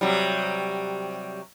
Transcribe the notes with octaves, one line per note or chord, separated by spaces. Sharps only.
C3 F#3 G3